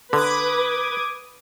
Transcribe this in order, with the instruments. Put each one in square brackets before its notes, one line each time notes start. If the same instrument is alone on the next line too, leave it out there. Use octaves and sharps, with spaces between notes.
[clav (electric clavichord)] D3 [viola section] B4 [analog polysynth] D6 D#6 G#6